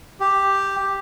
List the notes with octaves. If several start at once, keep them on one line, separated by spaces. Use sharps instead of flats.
G4